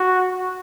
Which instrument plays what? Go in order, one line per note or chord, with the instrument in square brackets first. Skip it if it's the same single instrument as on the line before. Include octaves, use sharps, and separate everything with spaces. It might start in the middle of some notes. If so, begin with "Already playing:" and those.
Already playing: [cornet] F#4